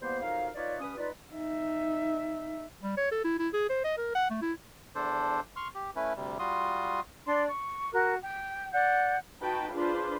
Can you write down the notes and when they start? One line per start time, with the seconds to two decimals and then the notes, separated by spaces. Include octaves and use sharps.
0.01 E2 G3 A#3 B3 C5
0.22 F2 F#3 D#4 A#4 C5 F5
0.55 D#4 F4 B4 C#5 D5
0.80 G2 C#4 B4 D#6
0.98 D#4 F4 B4 D5
1.34 D#4 E5
2.83 G3
2.97 C#5
3.11 A4
3.24 E4
3.39 E4
3.53 G#4
3.69 C5
3.84 D#5
3.98 A#4
4.15 F#5
4.30 A3
4.42 E4
4.95 E2 D4 A4 C5
5.56 C6 C#6 F6
5.75 G4
5.96 A3 C#4 E4 B4
6.16 D2 C3 G3
6.39 G3 F4 F#4 C6 D#6
7.27 D4 D5 C6
7.49 C#6
7.93 F#4 A#4 F#6
8.22 G5
8.73 D5 F#5 G6
9.41 D#4 F#4 B4 G5 A5
9.73 D4 F4 G#4 B4 C5